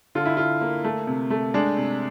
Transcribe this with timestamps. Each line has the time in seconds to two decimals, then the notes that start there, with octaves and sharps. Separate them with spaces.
0.15 D3 F4
0.25 E4
0.37 D3 F4
0.61 A#3
0.84 A3
1.07 C3
1.30 A3
1.54 G#3 D4
1.77 C3